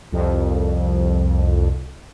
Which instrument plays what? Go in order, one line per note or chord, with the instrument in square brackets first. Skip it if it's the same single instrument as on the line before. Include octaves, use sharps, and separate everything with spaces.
[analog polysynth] C2 F2